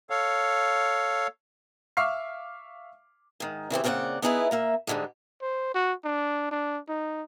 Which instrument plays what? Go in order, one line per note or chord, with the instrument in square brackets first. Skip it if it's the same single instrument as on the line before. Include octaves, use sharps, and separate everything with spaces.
[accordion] A4 C#5 F5
[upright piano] E5 F5 C#6 D6 F6 C7
[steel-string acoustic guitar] G#2 D#3
C#3 E3 C4 G4
A#2 C#3 C4 C#5 D5 F#5
B3 D#4 E4 G#4 A4 B4
A#2 A#3 E5
G#2 B2 D3 G3 G#3
[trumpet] C5
F#4
D4
D4
D#4